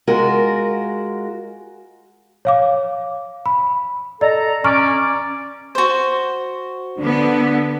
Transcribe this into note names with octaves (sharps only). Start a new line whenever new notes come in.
G#3 F4 F#4 A#4
C#5 F5 D6
B5
A4 D5 D#5 A#5
C#4 D5 A#5 C#6 F6
F#4 C5
D3 B3 D4